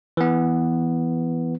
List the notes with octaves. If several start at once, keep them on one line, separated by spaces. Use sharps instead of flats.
E3 B3